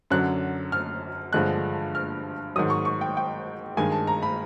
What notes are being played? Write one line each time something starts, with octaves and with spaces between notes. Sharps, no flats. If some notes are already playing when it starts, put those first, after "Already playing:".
F#2 D3 F#3 F#6
F6
G2 D3 F3 G#3 F#6
F6
G#2 D#3 F#3 D#6
C#6
C#6
G5
G5
G2 D#3 G#3 G#5
A5
A#5
B5